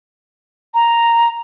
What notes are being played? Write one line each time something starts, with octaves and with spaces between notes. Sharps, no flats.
A#5